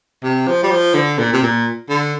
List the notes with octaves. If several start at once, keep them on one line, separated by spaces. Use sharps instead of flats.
C3
F3
G3
F3
D3
A#2
C3
A#2
D3